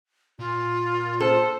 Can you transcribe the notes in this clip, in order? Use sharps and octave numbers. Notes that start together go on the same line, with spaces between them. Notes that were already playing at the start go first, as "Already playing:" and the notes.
A#2 F4
A4 C5